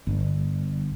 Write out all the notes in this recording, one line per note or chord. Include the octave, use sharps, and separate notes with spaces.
G1